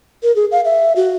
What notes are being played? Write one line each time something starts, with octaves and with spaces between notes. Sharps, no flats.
A#4
G#4
F5
E5
F#4